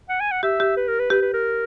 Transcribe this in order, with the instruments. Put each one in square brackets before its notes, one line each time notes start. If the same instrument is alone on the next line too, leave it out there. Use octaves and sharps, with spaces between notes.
[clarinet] F#5
G#5
F#5
[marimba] G4 [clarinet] E5
[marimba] G4
[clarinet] B4
A#4
B4
[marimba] G4 [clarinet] B4
[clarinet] B4
A#4